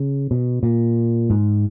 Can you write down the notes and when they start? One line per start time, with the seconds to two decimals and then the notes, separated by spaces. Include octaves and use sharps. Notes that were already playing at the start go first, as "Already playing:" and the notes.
Already playing: C#3
0.31 B2
0.63 A#2
1.30 G#2